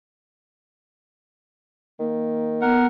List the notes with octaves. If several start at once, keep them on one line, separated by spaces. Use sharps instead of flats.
D#3 A#3
B3 A#4 F#5